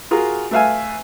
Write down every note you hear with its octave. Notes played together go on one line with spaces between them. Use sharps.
F4 F#4 G#4 A#4
A3 B4 E5 F5 G#5